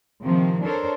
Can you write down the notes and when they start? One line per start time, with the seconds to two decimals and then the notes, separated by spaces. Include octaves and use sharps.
0.23 C3 D#3 F3 A#3 C4
0.62 D4 A4 A#4 C5 C#5